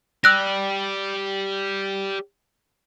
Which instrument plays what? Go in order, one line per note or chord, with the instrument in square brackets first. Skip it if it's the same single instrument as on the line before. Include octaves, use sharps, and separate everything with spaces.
[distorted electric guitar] G4 D5 [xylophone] E6 F#6 A#6